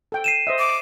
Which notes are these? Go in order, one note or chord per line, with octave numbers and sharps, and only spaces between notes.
A4 G5
C7 D#7 E7
C5 D#5 E5
D6